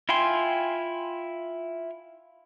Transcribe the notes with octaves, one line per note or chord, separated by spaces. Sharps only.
E4 F4 G5 G#5 C6